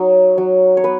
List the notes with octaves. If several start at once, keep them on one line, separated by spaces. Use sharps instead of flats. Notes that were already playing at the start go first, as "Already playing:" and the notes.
Already playing: F#3 D#4
F#3
C#5
B3 B4